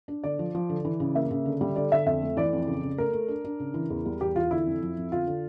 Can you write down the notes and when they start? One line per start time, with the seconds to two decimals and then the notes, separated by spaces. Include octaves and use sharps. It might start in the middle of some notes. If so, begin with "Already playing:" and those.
0.08 D4
0.23 D3 D5
0.39 F3
0.55 F3
0.70 D3
0.85 E3
1.00 C#3
1.15 A#3 E5
1.31 C#3
1.46 D3
1.61 G3
1.76 D3 D5
1.91 D3 E5
2.06 F2 E5
2.22 A3
2.37 E3 D5
2.53 F2
2.67 C#3
2.83 C#3
2.98 A3 A#4
3.13 A3
3.28 D4
3.45 D4
3.60 C#3
3.74 E3
3.90 E2
4.05 G3
4.21 E2 G4
4.36 E3 F4
4.51 D3 E4
4.66 F2
4.82 F3
4.97 F2
5.12 D3 F4
5.27 D3